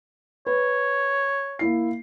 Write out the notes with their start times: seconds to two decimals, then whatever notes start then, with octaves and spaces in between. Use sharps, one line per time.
0.47 B4 C#5
1.59 A#3 E4 C7